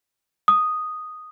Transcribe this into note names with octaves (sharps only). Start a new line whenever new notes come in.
D#6